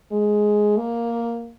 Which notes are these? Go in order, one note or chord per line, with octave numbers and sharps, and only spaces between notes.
G#3
A#3